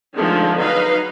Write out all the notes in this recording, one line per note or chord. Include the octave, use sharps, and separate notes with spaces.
D3 D#3 F3 G#3 A3
F#3 D#4 B4 F5